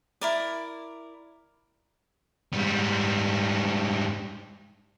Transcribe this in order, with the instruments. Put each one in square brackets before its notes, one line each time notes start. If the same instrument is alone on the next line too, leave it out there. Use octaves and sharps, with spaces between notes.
[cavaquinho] E4 A#4 D5
[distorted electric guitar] G#2 G3